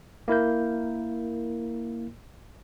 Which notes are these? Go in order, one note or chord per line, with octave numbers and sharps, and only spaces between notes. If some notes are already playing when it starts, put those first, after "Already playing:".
A#3 E4 A#4 G6